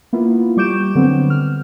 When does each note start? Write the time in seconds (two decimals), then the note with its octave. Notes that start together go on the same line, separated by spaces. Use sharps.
0.13 A#3 B3 E4 F4
0.57 G3 C#6 D6 G6 D7 E7
0.95 D3 F#3 B3 C4
1.30 F6